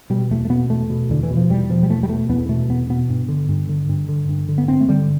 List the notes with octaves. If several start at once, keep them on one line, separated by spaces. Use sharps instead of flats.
B2 G3
E2 A3
A3
B2 B3
E2 A3
B2
E2 D3
E3
B2
F3
E2 G3
B2 F3
G3
E2 A3
G3
B2 A3
E2 B3
B2 A3
E2 B3
B2 B3
G2
D3
G2
D3
G2
D3
G2
D3
B3
G2 C4
A3
D3 G3